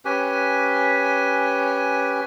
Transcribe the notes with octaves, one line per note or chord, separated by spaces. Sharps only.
C#4 G4 B4 G#5